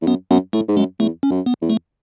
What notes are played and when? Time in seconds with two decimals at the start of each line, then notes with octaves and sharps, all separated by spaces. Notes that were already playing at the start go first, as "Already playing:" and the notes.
0.02 E2
0.07 F#2 B3
0.30 F#2 B3
0.53 A2 A3
0.68 G#2
0.77 F#2 G#3
1.00 E2 A3
1.23 C#4
1.31 F#2
1.46 B3
1.62 E2
1.70 A3